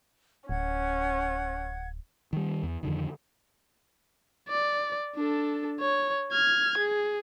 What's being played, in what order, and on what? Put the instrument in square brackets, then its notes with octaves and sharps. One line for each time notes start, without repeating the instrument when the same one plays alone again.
[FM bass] D1 [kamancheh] C#4 [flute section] F#5 G#6
[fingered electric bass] D#3 G3
E2
F2 D3 D#3
[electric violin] D5
D4 A4
C#5
F6 G#6
G#4